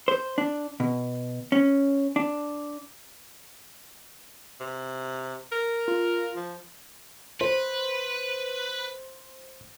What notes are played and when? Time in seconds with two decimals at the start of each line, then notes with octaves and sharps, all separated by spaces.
0.08 C5
0.38 D4
0.80 B2
1.52 C#4
2.16 D4
4.60 C3
5.52 A#4
5.88 F4
6.36 F3
7.41 B4 C5